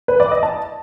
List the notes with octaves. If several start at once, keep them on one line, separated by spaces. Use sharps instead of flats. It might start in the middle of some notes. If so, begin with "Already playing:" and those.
B4
D5
D#5
A5